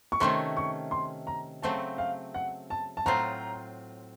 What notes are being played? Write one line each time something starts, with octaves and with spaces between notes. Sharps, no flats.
C#6
C3 D#3 A3 C#4 C6
C#6
C6
A#5
C#3 F#3 A3 C4 A5
F5
F#5
A5
A5
A2 F#3 C4 F4 A#5